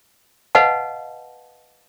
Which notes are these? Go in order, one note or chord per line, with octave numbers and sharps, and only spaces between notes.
B4 D#5 F5 F#5 A5